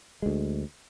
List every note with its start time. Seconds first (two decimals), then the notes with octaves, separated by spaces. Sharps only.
0.22 D2 G#3